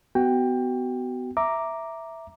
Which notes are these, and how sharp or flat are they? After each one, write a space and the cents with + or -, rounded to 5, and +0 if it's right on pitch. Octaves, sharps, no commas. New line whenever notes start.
B3 +25 F#4 +30 G5 +20
E5 +0 A#5 +0 D6 +0